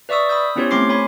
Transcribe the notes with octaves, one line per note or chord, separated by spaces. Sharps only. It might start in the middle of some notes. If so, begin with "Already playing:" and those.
B4 D5 E5 C#6 D#6 E6
B5 D#6 E6 G6
B3 C#4 E4 G4 C5 C#5
A3 C4 C6 D6 C7
C#5 G#5 B5